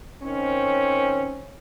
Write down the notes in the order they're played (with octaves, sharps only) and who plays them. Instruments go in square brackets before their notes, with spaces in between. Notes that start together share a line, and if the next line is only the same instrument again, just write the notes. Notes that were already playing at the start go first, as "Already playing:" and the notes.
[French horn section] D#3 C4 C#4